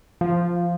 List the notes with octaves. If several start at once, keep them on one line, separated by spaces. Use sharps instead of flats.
F3